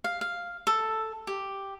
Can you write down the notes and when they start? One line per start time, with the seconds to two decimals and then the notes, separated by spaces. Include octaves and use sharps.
0.04 F5
0.21 F5
0.67 A4
1.27 G4